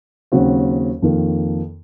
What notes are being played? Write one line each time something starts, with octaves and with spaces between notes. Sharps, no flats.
D#2 C#3 F#3 C4 F#4
F2 D#3 A#3